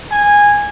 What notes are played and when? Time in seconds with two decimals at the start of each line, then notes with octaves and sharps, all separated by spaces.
0.11 G#5